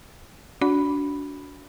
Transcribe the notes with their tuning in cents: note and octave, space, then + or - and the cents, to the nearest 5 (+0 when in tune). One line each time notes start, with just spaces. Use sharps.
D4 -30 F#4 -10 B5 +0